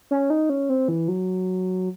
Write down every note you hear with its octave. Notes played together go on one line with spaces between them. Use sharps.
C#4
D#4
C#4
C4
E3
F#3